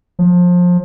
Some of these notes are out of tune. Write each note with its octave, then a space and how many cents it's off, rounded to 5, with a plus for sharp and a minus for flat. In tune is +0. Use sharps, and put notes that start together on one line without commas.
F3 +25